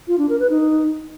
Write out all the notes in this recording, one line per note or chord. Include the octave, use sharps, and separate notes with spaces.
F4
D4
A#4
B4
D#4